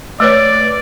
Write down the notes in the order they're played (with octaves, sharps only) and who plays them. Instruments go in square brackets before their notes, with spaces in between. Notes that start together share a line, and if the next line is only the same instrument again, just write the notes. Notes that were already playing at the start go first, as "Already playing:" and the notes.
[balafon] A3 B4 C#5 [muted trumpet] D5